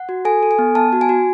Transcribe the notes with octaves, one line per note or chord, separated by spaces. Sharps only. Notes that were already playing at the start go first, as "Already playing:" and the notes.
Already playing: F#5
F#4
A4 G#5
A4
G#5
B3
B3 A5
F#4
G#5
F#4